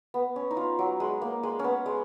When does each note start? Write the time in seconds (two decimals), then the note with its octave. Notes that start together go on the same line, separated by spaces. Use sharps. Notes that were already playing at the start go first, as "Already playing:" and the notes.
0.14 B3
0.36 C#4
0.51 D#4
0.57 F4
0.79 F#3
1.00 G#3
1.22 A#3
1.43 G#3
1.59 B3 C#4
1.86 G#3